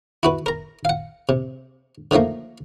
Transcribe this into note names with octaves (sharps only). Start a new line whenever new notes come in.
E4 F#4 B4
A#4 A#5
F5 F#5
C3
D3 D#3 F3 A3 A#3